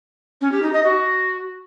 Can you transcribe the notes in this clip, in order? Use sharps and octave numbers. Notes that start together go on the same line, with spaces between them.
C#4
G4
D#4
D#5
F#4